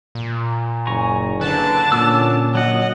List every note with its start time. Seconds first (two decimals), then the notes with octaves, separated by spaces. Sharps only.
0.15 A#2
0.87 F#1 G#5 A#5 C#6
1.41 D3 D4 B4 A5
1.92 A#2 C#4 D6 E6
2.55 F#3 D#5 F#5